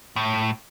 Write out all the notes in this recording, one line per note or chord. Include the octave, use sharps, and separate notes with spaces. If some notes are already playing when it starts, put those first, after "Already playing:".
A2